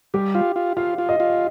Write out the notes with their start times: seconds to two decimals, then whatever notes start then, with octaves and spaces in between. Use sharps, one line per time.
0.14 G3 G4
0.35 F4
0.56 F4
0.77 F4 F5
0.98 F4
1.09 D#5
1.20 F4